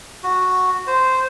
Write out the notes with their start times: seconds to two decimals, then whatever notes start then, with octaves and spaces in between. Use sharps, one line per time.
0.23 F#4
0.87 C5